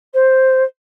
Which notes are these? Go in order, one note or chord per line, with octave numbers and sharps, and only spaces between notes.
C5